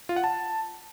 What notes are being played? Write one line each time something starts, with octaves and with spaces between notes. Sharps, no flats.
F4
F#5
A5